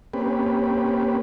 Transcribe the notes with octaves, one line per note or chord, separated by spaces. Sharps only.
A#3 C4 C#4 G4 B4